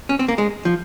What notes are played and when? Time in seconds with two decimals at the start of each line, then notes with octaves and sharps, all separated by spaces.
0.09 C#4
0.19 C4
0.28 A#3
0.38 G#3
0.65 F3